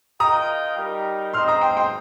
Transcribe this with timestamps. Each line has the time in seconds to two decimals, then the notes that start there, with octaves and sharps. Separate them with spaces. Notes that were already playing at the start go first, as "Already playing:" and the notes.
0.20 F4 A#4 D#5 G5 A#5 D#6
0.76 G3 D#4 G4 A#4
1.33 C4 D#4 C5 D#5 C6 F6
1.48 A#5 D#6
1.61 G5 C6
1.77 G5 C6